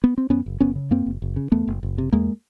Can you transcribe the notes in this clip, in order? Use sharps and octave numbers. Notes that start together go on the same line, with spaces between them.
B3
C4
F#2 B3 C#4
F#1
F#1 B3 C#4
C#3
F#2 A#3 C4
F#1
F#1
C#3
E2 A3 B3
F#1
F#1
C3
E2 G#3 A#3